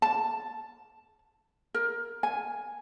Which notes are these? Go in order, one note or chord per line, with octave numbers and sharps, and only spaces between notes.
A5
A#4
G#5